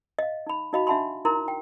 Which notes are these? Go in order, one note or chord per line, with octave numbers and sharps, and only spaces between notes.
D#5 F5
D#4 B5
D#4 F#4 D#5 F5 B5
D4 E5 F#5 A5 B5 C6
D#4 E4 A#4 A#5 C6
G5